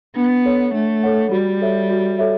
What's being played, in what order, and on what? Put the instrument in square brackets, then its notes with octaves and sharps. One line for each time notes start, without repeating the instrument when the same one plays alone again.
[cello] B3 [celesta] D4
[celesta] A4 C#5 F#5
[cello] A3 [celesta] D4
[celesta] A4 C#5 F#5
[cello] G3 [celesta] F#4
[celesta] A4 C#5 E5
F#4
A4 C#5 E5